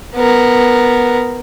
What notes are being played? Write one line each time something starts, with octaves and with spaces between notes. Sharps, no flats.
B3 A#4